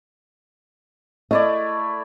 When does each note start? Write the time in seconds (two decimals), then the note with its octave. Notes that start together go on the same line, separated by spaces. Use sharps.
1.31 A3 E4 D5 D#5